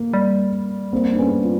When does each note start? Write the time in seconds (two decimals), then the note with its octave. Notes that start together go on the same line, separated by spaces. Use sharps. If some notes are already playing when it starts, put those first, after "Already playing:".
Already playing: A#3
0.14 G3
0.93 A#3 C4
1.12 D4
1.19 B3 C#4
1.45 F4